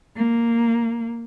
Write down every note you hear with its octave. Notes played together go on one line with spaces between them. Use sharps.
A#3